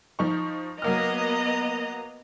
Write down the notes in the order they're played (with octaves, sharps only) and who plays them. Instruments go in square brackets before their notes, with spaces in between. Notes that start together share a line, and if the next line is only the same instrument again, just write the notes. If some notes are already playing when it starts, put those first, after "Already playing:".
[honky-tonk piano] F3 D#4 C#6
[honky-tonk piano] F#3 A#3 F6 [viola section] B3 D#5 A#5